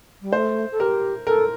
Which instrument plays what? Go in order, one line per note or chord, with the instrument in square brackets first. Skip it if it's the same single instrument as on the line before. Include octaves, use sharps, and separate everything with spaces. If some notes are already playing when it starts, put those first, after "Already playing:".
[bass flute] G3
[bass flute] A3 [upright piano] C5
[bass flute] A4
[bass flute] G4 [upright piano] A#4
[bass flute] A4 [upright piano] A#4